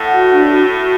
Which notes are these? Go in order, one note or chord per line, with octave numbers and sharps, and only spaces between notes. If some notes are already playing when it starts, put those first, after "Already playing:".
Already playing: A2 F#5
F#4
D4
F#4
F#4